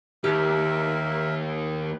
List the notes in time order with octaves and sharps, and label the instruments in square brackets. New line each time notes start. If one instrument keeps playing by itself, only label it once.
[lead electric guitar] D#2 [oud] G4 [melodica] A#4 E5